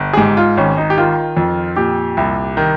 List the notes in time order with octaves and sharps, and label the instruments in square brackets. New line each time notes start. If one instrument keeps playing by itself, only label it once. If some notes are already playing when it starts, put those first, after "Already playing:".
Already playing: [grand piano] G1
G#4
G#2 G4
F4
G#1 C#4
D#4
G4
D#3 F4
F2
A#2 G4
C2
D#3